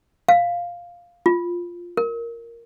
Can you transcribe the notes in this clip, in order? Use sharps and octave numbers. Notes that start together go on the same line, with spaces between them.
F5
F4
A#4